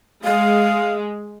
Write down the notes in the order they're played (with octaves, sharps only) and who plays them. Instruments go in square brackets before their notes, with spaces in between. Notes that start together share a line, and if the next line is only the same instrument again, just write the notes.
[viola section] G#3 [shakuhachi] F5